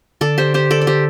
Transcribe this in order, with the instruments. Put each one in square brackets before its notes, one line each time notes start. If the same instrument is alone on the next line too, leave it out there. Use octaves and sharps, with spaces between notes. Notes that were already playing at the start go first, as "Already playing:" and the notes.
[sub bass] D3 [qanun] A4 D5
[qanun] G4 C5
G4 C5
A4 D5
D5
G4 C5